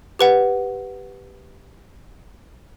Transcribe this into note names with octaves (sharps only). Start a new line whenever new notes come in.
G4 B4 F#5